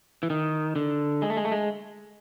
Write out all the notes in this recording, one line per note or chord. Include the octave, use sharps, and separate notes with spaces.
E3
D#3
D3
G#3
A3
G#3
A3
G#3